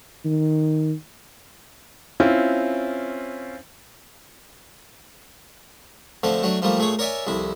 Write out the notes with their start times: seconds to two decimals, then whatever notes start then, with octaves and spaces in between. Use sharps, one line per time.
0.25 D#3
2.20 C4 C#4 E4 F4
6.23 D3 F3 A3 C4
6.43 F#3 A3 D4
6.62 F3 G3 A3 A#3
6.78 A#2 A3 G#4 C#5
6.99 A#4 C#5 D5 E5 G#5
7.27 C2 F2 E4